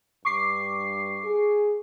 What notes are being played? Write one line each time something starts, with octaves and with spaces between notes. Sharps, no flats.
G2 C#6 D6 C7
G#4